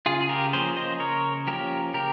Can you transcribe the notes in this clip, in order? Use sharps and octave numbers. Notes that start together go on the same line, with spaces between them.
C#3 F4 G#4
G#4
G4 A#4
F3 A#3 C#4 G#4 C5
C5 D#5
C#3 A#4 C#5
F3 A#3 C#4 G4 A#4
C#3 G4 A#4